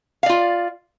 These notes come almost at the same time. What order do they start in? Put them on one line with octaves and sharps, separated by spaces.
F5 D5 F4